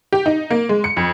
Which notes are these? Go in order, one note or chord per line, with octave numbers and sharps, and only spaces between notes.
G4
D#4
A#3
G#3
C#7
F2